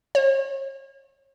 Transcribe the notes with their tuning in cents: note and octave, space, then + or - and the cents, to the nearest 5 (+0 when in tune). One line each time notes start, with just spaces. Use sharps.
C#5 -35